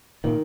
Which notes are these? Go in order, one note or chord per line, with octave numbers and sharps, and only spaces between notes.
A#2 D#3